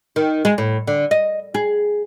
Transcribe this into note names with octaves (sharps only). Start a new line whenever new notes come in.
D#3
G#3
A2
D3
D#5
G#4